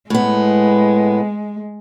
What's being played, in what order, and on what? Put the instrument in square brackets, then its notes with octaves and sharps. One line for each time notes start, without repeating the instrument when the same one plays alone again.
[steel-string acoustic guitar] A2 B3 [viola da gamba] G#3